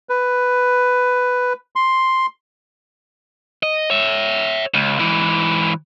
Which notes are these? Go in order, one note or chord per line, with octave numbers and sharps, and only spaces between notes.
B4
C6
D#5
C#5 E5
C#2
G#2 E3